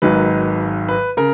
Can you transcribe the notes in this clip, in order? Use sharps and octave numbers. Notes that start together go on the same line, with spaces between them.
G#1 G#2 D#3 F#3 B4
B4
C#3 A#4